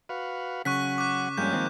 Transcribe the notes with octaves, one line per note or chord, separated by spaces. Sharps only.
F#4 B4 F5
C#3 F#3 F#5 C#6 F#6 B6
D6 F#6
G2 F3 G#3 A#3 C#4 G6
D#3 C4